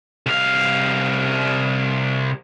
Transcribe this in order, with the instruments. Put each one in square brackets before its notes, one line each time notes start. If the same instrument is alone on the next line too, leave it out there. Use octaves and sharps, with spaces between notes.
[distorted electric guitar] C2 F5